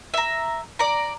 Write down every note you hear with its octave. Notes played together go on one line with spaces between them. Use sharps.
E5 A#5
D5 A#5